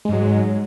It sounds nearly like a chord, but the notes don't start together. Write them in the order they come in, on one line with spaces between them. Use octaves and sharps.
G#3 G#2 F#3